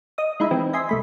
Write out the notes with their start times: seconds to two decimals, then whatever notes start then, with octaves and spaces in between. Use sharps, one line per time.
0.18 D#5 D#6
0.40 G#3 D#4 E4 E5
0.51 E3 C4
0.73 D#5 E5 G#5 C6
0.89 C2 A3 B5